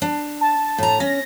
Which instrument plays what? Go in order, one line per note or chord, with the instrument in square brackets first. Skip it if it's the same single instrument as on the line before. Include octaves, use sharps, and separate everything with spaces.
[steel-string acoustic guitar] D4
[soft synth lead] A5
[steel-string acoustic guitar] A2 A#5
[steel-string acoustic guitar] C#4 [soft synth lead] A#6